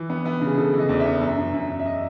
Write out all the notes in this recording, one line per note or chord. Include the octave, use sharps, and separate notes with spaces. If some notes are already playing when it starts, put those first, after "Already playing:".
Already playing: E3
B3
B3
C#3
G#4
C#3 A4
E3
D#5
E2
E5
B3
F#2
F#2
F#2
F#2
E5
D#5